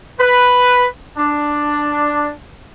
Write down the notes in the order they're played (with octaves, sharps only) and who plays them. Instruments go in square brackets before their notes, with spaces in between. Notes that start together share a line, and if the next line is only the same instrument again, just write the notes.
[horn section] B4
D4